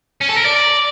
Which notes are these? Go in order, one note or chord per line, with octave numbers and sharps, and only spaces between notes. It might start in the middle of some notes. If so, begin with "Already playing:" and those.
C#4
A4
A#4
D5